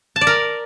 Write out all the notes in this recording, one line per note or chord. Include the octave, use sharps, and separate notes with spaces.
A5
D5
A#4